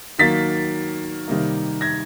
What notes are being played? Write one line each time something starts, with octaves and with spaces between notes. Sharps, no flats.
D#3 F#3 A#3 A6 B6
C3 D#3 G3 A#3
G#6 A#6